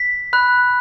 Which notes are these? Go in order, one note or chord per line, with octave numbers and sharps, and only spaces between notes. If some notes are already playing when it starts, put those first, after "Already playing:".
Already playing: B6
B5 F#6